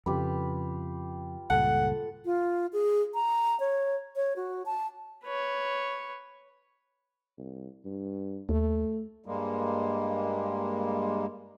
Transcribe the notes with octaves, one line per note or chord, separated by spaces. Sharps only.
F2 C#3 F4 G4 B4
C#2 G2 A#2 A4 F#5
F4
G#4
A#5
C#5
C#5
F#4
A5
B4 C#5
C2
G2
D#2 A3
G2 G3 G#3 A#3